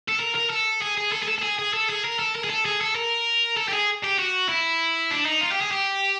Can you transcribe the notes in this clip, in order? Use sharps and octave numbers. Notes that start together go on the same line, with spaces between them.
A4
A#4
A#4
A4
G#4
G#4
A4
G#4
A4
A4
G#4
G#4
A4
G#4
A#4
A4
A#4
G#4
A4
G#4
A4
A#4
A4
G4
G#4
G4
F#4
E4
D4
D#4
F4
G4
G#4
G4